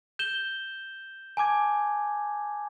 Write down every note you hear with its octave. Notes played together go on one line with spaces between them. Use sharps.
G6 E7 G7
G#5 A5 D6 G#6